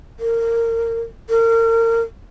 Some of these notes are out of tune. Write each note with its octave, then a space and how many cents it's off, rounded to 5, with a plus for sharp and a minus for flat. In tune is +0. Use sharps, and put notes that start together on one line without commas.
A#4 -25
A#4 -30